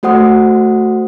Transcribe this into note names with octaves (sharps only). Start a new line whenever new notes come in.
A3 F#4 C5 F#5 D#6